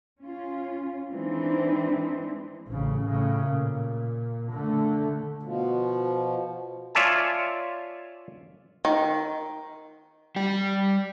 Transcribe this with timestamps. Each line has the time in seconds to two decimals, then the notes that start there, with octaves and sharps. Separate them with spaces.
0.21 C#4 F4
1.12 E3 G#3 C4 D4 D#4
2.68 A1 C#3
3.05 A2 C#3
3.46 A#2
4.51 D3 A3
5.43 B2 F3
6.95 F4 C#5 D5 E5 G#5 A5
8.85 D#3
10.36 G3 G4